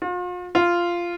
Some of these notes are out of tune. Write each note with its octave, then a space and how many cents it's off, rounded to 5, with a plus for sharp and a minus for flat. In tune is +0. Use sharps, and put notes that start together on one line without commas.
F4 +40
F4 -10